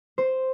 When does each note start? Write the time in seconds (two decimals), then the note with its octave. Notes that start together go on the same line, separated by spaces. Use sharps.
0.18 C5